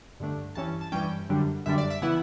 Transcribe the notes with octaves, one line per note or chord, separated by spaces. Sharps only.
G2 D3 A3 D4
G2 E3 G3 C#4 A5
A5
G2 E3 G3 C#4 G5
F#2 D3 G3 D4
F#2 D3 G3 D4 E5
D5
E5
C#3 E3 B3 E4 F#5